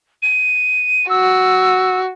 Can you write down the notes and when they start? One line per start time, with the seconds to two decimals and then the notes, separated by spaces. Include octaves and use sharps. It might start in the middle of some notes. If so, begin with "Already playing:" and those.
0.22 D#7
1.10 F#4 E6